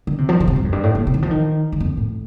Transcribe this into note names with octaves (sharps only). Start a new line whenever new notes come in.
D3
C3
F3
D#3
C3
G2
F2
G2
A2
A#2
C3
D#3
F3
D#3
D3
F2
A2